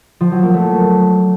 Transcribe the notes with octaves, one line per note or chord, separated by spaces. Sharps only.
F3
F#3
A#3
A3